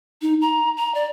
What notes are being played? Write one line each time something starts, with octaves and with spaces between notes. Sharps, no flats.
D#4
A#5
A#5
D5